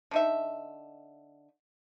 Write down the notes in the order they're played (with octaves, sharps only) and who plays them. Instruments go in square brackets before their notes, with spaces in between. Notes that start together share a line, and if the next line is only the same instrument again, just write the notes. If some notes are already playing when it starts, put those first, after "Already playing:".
[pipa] D3 D#4 E5